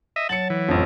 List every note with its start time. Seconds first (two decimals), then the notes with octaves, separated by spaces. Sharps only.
0.16 D#5 E5
0.29 F#3 C#5 A5 E6 C#7 F#7
0.50 E3
0.68 A1 F2 F3